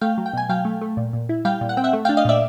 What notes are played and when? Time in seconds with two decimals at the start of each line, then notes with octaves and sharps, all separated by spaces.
0.01 A3 F5 G5
0.18 F#3
0.26 G5
0.33 B2 G#5
0.49 F#3 F5 G5
0.65 A3
0.81 A3
0.97 A#2
1.13 A#2
1.29 E4
1.45 G3 F5 G5
1.61 A#2
1.69 F#5
1.77 C4 G5
1.84 E5 F#5
1.93 A3
2.05 F5 G5
2.09 D4
2.17 D#5 F5
2.25 A#2 D5 E5